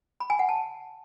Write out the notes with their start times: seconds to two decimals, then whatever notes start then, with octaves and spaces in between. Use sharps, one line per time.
0.20 B5
0.30 G#5
0.39 F#5
0.49 A5